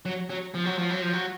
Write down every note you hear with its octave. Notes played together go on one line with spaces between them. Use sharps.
F#3
F#3
F3
F#3
F3
F#3
F3
F#3